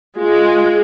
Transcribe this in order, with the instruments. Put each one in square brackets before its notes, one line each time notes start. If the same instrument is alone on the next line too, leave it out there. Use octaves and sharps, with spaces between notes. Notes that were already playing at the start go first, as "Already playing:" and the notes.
[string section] G#3 [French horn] F4